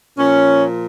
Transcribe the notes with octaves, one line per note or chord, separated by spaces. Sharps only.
A#2 F3 C#4